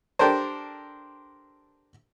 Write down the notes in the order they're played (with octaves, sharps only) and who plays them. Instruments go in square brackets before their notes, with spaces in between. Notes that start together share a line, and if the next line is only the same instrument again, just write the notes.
[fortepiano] D4 G4 A4 A#4 C5